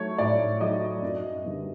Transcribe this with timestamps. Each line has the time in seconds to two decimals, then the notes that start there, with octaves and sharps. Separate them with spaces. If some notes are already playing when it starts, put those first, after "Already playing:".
Already playing: F#3 A3 C#5
0.18 A2 D5
0.61 F#3 A3 D#5
1.03 F#2
1.44 D3 G3 B3